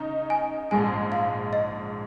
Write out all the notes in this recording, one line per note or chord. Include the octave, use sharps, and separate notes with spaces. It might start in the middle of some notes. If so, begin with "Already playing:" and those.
Already playing: C#3 D#4 A#5
G#5
A#1 G#2 G#3 G#5
F5
D#5